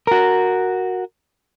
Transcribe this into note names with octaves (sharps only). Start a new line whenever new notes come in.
F#4 A#4